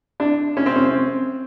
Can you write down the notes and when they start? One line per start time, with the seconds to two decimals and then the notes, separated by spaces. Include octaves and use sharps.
0.20 D4
0.57 C#4
0.66 C4
0.76 C#4
0.85 C4